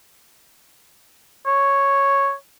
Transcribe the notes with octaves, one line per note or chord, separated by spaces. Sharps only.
C#5